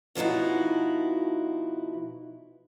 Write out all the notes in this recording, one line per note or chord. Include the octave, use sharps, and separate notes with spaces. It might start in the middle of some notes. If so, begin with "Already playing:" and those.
B2 F3 D#4 E4 F#4